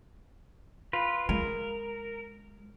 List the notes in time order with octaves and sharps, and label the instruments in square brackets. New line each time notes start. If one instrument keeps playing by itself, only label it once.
[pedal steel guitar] F4 B4
[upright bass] G#3 [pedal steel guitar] A#4